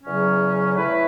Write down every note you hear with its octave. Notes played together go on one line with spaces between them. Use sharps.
E2 C#3 F#3 C#4
A2 A3 E4 B4